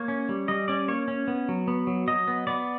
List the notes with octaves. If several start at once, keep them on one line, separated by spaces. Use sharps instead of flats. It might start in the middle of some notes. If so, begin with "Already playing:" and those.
Already playing: A#3 C#5
C#4
G3
G3 D#5
C#4 D5
A#3 C#5
C#4
B3
F#3
B3
F#3
F#3 D#5
B3
B3 D5